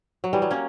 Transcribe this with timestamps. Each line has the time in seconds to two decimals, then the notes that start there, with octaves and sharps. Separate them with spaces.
0.24 F#3
0.33 E3 G3
0.42 F#3
0.51 A#3 C#4